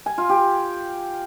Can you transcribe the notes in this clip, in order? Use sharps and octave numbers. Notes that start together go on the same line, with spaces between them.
G#5
F4
G4